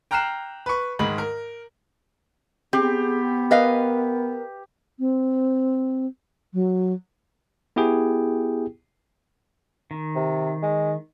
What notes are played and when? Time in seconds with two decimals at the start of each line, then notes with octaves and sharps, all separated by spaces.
0.11 G5 A#5 F6 F#6 C7 E7
0.66 B4 C#6
0.99 G#2 D#3 G#3 B5 F#7
1.18 A#4
2.73 B3 C4 G4 G#4
3.51 A#4 B4 D#5 F5
4.99 C4
6.54 F#3
7.76 B3 E4 G4 G#4 G5
9.91 D#3
10.16 C3
10.63 G#3